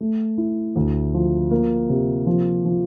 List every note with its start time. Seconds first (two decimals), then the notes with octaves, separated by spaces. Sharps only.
0.01 A3
0.38 E4
0.76 D2
1.14 F3
1.51 A#3
1.90 C3
2.26 F3
2.65 F3